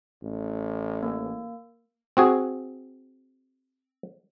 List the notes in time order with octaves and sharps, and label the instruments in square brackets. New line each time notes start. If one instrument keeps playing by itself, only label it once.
[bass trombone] A1
[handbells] A#3
[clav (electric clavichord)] C4 F#4 G#4